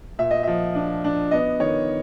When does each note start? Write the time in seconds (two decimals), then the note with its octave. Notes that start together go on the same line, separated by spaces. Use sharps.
0.19 A#2 E5
0.31 D#5
0.43 F3 E5
0.75 D4
1.04 D4
1.31 B3 D#5
1.60 D#3 C#5